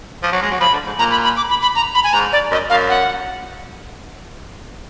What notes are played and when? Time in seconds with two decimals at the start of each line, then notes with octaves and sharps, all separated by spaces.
0.23 F3
0.32 F#3
0.42 G#3
0.51 F#3
0.60 F3 B5
0.73 D3
0.86 G#2
0.99 A#2 A#5
1.11 B5
1.24 B5
1.37 D6
1.50 B5
1.62 B5
1.75 A#5
1.95 B5
2.04 G#5
2.13 G#2 A#5
2.33 D5
2.51 F#2 D#5
2.70 F#2 F5
2.89 F#5